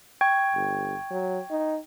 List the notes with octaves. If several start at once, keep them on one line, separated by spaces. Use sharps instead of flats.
G5 C#6 G#6
G1
F#3
D#4